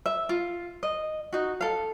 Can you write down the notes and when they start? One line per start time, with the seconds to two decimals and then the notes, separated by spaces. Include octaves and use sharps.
0.06 E5
0.29 F4
0.83 D#5
1.33 D#4 F#4
1.61 A4 F5